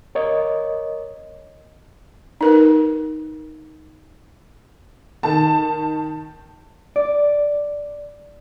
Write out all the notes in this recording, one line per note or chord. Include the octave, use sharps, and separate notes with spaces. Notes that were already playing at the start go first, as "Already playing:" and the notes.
A#4 C#5 D#5
D#4 A#4 B4
D#3 A5
D5